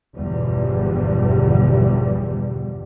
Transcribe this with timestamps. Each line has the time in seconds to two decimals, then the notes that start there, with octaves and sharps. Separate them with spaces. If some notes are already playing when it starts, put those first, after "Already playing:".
0.17 G1 E2 B2 D3 F3 G3